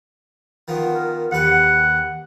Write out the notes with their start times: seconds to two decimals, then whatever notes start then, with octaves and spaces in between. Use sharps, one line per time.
0.68 D#3 F3 B3
0.93 A#4
1.31 D#2 G3 B4 F#5